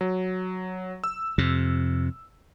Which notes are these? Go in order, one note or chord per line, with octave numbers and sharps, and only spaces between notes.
F#3
E6
F2 C3